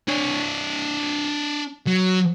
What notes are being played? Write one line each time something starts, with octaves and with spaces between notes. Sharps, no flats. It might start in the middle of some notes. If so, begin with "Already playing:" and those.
D4 C#5
F#3